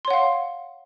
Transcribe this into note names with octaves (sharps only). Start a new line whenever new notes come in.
C#5 F5 F#5 C6